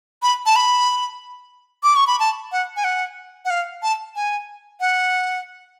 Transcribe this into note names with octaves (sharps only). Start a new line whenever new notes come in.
B5
A5
B5
D6
C#6
B5
A5
F#5
G#5
F#5
F#5
F5
A5
G#5
F#5